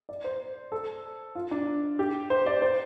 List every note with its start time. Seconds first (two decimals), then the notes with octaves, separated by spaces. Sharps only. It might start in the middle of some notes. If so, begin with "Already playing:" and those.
0.09 D5
0.24 C5
0.72 A4
1.35 F4
1.51 D4
1.99 G4
2.30 C5
2.46 D5
2.62 C5